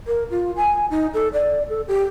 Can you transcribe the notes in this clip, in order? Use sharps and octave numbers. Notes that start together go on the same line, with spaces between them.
A#4
F4
G#5
D#4
A4
D5
A4
G4